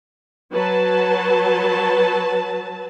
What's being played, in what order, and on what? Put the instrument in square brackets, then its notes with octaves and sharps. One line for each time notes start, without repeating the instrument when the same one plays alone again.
[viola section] F#3 B4 A5